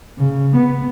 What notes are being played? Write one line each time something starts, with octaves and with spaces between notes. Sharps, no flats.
C#3
B3